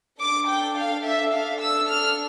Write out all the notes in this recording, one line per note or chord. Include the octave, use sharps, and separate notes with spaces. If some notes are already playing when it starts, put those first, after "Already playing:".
D4 A4 D6
G5
F5
E5
D4 A4 F5
E6
F6